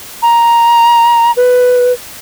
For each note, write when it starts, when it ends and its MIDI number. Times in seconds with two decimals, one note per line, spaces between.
0.22 1.31 82
1.37 1.92 71